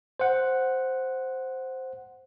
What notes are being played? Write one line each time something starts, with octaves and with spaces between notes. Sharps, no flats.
C5 F#5